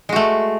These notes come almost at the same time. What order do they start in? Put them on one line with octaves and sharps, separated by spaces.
G#3 F#4 A3